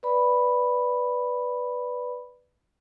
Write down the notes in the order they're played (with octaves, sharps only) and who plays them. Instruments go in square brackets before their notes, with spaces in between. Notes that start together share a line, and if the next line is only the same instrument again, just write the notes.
[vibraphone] B4 D5 B5